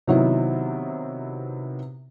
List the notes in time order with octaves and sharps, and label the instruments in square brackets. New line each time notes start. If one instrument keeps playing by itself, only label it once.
[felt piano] C3 D#3 F#3 B3 E4